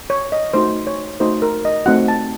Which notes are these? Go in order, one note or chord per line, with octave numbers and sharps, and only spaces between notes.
C#5
D#5
A3 D#4 F#4 C5
C#5
A3 D#4 F#4 C5
A#4
D#5
A3 C4 D#4 F#4 F#5
A5